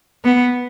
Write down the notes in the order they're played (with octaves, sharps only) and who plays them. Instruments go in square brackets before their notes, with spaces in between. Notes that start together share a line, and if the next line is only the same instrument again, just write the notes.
[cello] B3